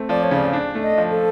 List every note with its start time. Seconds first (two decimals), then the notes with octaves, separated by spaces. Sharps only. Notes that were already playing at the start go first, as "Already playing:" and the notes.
Already playing: A3 C4
0.09 F3 D5
0.23 C#5
0.31 C#3 D5
0.53 D4
0.75 A3
0.83 D#5
0.98 F3
1.11 A4